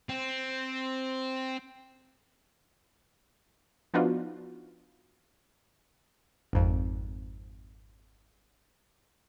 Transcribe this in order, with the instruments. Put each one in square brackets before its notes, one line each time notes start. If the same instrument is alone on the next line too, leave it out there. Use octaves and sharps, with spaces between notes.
[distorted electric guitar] C4
[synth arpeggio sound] F3 B3 D4 D#4 F4 F#4
[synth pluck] G#1 F2